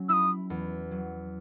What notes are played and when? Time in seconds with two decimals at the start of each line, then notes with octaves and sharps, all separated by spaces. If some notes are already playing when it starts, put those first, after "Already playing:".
Already playing: F#3 C#4
0.09 E4 D#6 E6
0.50 E2
0.91 F#3